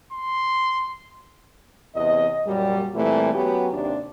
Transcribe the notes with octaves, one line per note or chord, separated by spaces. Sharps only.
C6
E2 C3 D#5
F#2 A#2 G3
A#2 E3 G3 A3 C4
F#3 B3 C#4 G4
D#2 C3 D4